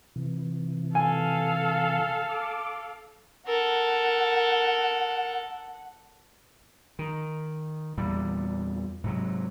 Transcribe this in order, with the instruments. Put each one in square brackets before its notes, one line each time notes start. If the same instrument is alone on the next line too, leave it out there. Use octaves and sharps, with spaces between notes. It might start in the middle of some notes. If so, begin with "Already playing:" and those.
[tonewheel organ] C3 E3
[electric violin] A4 F5 [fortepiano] G#5
[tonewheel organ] D6
[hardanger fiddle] A4 A#4 [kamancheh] F#5
[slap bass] D#3
E2 A#2 G3
G#2 C3 F#3